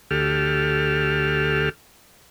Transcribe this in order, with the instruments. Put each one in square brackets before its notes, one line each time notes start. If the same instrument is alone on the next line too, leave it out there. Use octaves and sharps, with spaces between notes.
[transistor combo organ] D2 G4 A4 F6